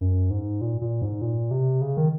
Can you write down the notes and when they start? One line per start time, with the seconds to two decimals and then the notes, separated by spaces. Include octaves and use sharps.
0.01 F#2
0.30 G#2
0.61 A#2
0.81 A#2
1.02 G#2
1.21 A#2
1.51 C3
1.81 C#3
1.97 D#3